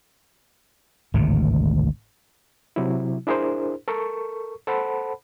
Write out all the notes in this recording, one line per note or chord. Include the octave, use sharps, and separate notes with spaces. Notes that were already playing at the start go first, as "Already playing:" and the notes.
G#1 D2 A2 C3
C3 F#3 E4
D4 E4 G#4 A#4 C5
A4 A#4 C#6
A4 C5 F#5 A5 B5